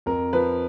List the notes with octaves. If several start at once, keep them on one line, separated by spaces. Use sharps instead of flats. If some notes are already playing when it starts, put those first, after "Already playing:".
F2 A#4
F3 B4